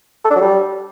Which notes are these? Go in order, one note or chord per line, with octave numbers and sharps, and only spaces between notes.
A4
D4
F#3
G3